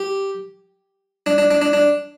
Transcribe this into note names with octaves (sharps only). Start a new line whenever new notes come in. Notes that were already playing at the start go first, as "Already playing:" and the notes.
Already playing: G4
D4
D4
D4
D4
D4